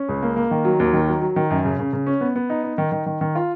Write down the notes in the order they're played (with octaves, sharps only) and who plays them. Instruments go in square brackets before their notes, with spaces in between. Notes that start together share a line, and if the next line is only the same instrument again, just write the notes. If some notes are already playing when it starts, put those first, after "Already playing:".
Already playing: [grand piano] C#4
C#2
A#3
A#3
D#3
F#3
D#2
D#3
F#3
F#3
D#3
F#2
C#3
C#3
C#3
C#4
B3
B3
D#4
D#4
D#3
D#3
D#3
D#3
F4